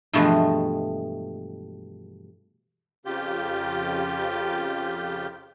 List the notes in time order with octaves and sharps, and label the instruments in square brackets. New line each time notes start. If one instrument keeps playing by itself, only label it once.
[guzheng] G2 B2 E3 F3 G#3 A3
[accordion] F2 C#3 F4 G4 G6